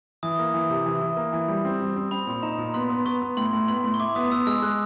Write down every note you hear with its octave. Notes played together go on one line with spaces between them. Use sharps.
E3 D#6
A#3
E3
C3
E3
E3
A#3
E3
G3
C4
G3
C4
C4 B5
A#2
D#4 A#5
A#2
B3 C6
B3
B3 C#6
B3
A2 C6
A2
B3 C6
A2
C#6
E4 D6
B3 D#6
B3 E6
G#3 F6
G#3 F#6